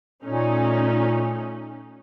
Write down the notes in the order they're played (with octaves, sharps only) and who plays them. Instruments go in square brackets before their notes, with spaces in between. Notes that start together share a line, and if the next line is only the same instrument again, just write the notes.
[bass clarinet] A#2 [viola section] A3 C#4 D#4